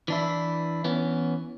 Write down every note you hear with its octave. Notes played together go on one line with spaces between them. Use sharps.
E3 D4 E4
E3 B3 C#4